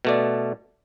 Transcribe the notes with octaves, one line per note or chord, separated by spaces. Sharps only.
B2 A3 D5